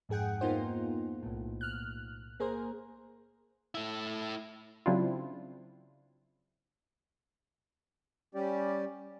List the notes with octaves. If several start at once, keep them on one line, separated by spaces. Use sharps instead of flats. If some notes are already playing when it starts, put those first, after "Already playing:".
F2 G#2 G#4 F#5 G5
A#3 B3 D#4 F4 C5
B1 A2
F6 F#6
A#3 G#4 A#4 C5
A3 E4
C#3 F#3 C4 D4 E4 F4
G3 C#4 G4 D5